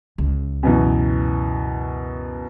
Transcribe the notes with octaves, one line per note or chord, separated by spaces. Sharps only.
C#2
F#2 B2 E3